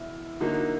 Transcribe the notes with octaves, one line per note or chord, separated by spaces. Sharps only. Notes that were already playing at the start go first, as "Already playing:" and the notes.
Already playing: E2 B2 E4
D3 F#3 A#3 D#4